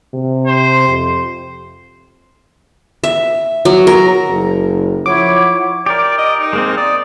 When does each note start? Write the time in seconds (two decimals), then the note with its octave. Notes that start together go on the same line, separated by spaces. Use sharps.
0.14 C3
0.47 C5
0.88 F2
3.04 E5
3.65 F#3
3.87 A#4
4.29 F#1
5.06 F3 E4 C#5 F#5 D6
5.86 G4 A#4 D5
6.18 D#5
6.41 D#4
6.53 G#3 A#3 C4
6.77 D5 D#6